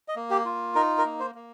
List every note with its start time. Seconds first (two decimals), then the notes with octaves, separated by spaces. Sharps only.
0.08 D#5
0.16 A#3
0.31 G4
0.45 F4
0.75 D#4 A#4
0.98 A#4
1.05 A#3
1.20 C5
1.35 A#3